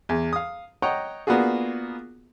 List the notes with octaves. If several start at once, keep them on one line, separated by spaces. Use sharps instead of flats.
E2
F5 D#6
C#5 D#5 F#5 G5 A#5
A#3 B3 D4 F4 F#4 G#4